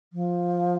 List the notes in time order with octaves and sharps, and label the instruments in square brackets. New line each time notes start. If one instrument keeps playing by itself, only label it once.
[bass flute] F3